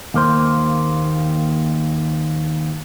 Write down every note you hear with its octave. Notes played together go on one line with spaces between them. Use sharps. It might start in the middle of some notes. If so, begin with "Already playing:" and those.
D#2 A#3 C5